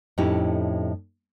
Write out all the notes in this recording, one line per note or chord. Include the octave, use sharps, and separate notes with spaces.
F2 A2 C#4 D#4 E4 G4